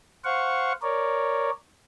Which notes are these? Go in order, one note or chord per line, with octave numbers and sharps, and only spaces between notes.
C5 F5 F#5 C#6
A#4 C#5 D5